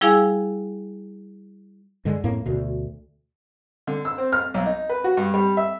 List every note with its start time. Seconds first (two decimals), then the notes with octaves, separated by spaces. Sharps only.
0.01 G3 E4 G#4 F5 G#5 E6
2.05 G2 D3 G#3
2.24 F2 A2 A#3
2.46 D2 B2
3.87 D3
4.05 E6
4.18 C4
4.33 F6
4.54 B1
4.66 D#4
4.89 B4
5.04 F#4
5.17 G2
5.34 G3
5.57 E5